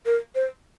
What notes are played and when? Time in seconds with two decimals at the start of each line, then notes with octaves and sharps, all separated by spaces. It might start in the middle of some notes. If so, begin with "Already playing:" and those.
0.06 A#4
0.35 C5